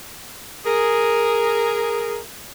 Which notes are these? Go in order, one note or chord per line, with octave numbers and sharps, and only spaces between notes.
G#4 A#4